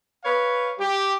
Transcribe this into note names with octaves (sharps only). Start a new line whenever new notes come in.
B4 C#5 F5
G4